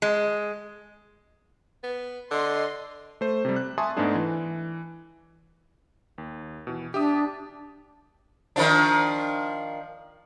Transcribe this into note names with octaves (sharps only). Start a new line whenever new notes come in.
G#3
B3
D3 D#5 C6
A3 C5
C3 G3
F#6
E5 G#5 A5 C6 C#6 D#6
G#2 G#3 A3 B3 D4 G#4
E3
D#2
B2 E3
D4 G4 E5 D#6
D#3 F3 D4